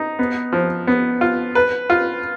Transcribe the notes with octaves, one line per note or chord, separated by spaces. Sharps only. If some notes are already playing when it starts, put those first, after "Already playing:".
Already playing: D#4
B3
F3
B3
F4
B4
F4